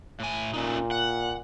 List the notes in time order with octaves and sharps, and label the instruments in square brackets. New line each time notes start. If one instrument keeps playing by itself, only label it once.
[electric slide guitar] A2 G#5
[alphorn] A#2 [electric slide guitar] A3 C#4 D#4
[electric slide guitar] F#5